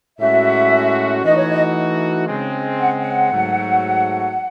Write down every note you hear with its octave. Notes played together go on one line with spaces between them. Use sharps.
A2 G#3 C#4 F#4 E5
E3 A3 D#4 F#4 D#5
C#5
D#5
C#3 G#3 C4
F#5
F#5
G#2 F#3 A3